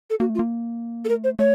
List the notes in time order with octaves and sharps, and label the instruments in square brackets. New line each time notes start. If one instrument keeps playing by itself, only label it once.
[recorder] A4
[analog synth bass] A#3 [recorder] F#4
[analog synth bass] A3
[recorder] F4
[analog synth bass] A#3
[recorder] A4
[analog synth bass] A3 [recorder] A#4
[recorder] C5
[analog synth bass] A3 [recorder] C#5